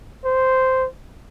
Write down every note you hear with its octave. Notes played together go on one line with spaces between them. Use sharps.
C5